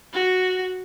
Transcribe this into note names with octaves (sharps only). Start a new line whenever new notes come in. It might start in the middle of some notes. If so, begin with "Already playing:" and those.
F#4